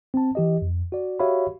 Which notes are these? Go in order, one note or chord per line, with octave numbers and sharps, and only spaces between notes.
C4 A5
E3 G4 D#5
F2
F#4 D5
F#4 G4 C#5 E5 F5 B5